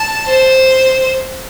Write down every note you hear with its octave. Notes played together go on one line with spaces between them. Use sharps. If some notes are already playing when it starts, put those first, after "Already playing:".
Already playing: A5
C5